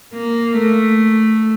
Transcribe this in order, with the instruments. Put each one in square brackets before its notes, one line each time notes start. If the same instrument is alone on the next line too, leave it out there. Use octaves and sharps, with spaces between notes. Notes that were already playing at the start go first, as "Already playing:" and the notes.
[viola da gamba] A#3
A3